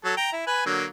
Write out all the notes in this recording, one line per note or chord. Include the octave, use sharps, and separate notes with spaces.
F#3 A4
G5 A#5
E4
B4 G#5 B5
D3 F#3 A#3